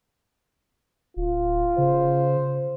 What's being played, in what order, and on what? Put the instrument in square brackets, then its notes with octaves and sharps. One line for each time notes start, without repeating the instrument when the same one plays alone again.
[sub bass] D1 [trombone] F4
[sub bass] C#3 [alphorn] C5